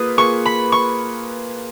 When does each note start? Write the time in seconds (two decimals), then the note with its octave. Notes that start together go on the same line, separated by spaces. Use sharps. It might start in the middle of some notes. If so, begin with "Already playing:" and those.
Already playing: A#3 F4 G#4 B4 D#6
0.17 A#3 F4 G#4 B4 C#6
0.46 B5
0.72 C#6